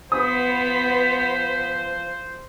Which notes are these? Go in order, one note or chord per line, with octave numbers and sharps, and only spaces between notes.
F3 B3 C5 D#6 B6